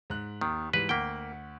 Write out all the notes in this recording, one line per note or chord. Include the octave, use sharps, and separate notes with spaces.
G#2 F#6
D#2 D#3
G#2 E3 G3 B4
D2 A#3 F#5 G5 B6